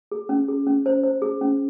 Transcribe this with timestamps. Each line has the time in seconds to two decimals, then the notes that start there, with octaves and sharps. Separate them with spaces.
0.11 G#4
0.29 C#4
0.48 G#4
0.67 C#4
0.86 C5
1.03 C5
1.22 G#4
1.41 C#4